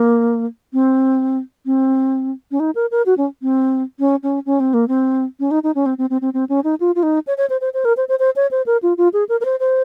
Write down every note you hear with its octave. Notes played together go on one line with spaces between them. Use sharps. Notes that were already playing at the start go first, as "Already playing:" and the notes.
Already playing: A#3
C4
C4
C#4
D#4
A#4
A#4
F#4
C#4
C4
C#4
C#4
C#4
C4
A#3
C4
C#4
D#4
D#4
C#4
C4
C4
C4
C4
C4
C#4
D#4
F4
F4
D#4
C#5
C#5
C5
C5
C5
A#4
C5
C5
C5
C#5
C5
A#4
F4
F4
G#4
A#4
A#4
C5
C5